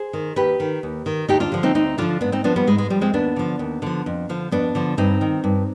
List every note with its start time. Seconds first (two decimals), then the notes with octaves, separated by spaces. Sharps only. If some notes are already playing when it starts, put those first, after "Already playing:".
Already playing: G#4 C5
0.13 D#3
0.36 D#2 G4 B4
0.60 D#3
0.83 D#2
1.06 D#3
1.28 D2 D#4 G4
1.40 D4 F4
1.52 D3 F3
1.63 C4 D#4
1.75 D2 C4 D#4
1.98 D3 F3 D4 F4
2.21 G#2 B3 D4
2.32 C4 D#4
2.44 F3 B3 D4
2.56 G3 B3
2.67 G#2 G#3
2.78 G#3
2.90 F3 G3
3.01 G#3 C4
3.13 D#2 B3 D4
3.36 D3 F3
3.59 D#2
3.82 D3 F3
4.06 F2
4.29 D3 F3
4.52 F2 B3 D4
4.75 D3 F3
4.97 G2 C4 D#4
5.21 D#3
5.44 G2